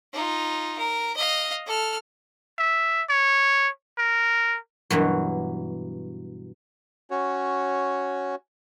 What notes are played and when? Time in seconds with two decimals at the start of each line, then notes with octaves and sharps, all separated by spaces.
0.13 D#4 F4
0.78 A#4
1.17 D#5 F5
1.66 A4 F6
2.59 E5
3.09 C#5
3.98 A#4
4.90 G2 B2 E3 F#3
7.11 C#4 F#4 C#5